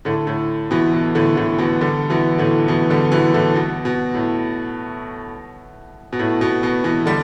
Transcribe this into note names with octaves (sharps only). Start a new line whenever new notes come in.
A2 D3
A2
B2 E3
B2
A2 D3
A2 D3
B2 E3
D3 G3
B2 E3
A2 D3
B2 E3
D3 G3
B2 E3
A2 D3
B2
B2
A2
B2
A2
B2
B2
B2 E3
D3 G3